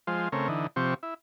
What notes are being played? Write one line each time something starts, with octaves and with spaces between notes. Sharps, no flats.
F3 G#3 F4 C5
C#3 A3 C4 A#4 C#5
D3 E3 D#4
C3 F3 C4 G4 C#6
E4